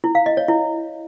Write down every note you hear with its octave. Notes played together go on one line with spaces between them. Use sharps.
E4
F5
D#5
C#5
E4